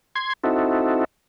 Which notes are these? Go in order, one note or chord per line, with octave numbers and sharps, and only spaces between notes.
C6 G#6
C4 D#4 E4 F#4 A4